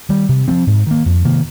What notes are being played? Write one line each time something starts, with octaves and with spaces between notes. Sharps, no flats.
D#3 G3
C3
F3 G#3 C4
G#2
D#3 A#3
F2
C3 D#3 A#3